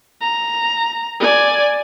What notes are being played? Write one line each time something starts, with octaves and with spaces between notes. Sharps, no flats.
A#5
D5 G#5